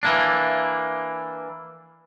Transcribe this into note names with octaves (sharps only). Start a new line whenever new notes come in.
E3 A#3 D4